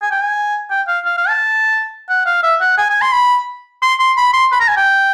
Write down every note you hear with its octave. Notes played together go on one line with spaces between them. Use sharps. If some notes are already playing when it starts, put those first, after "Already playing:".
G#5
G5
G#5
G5
F5
F5
F5
A5
F#5
F5
E5
F#5
G#5
G#5
C6
B5
C6
C6
B5
C6
B5
A#5
G#5
G5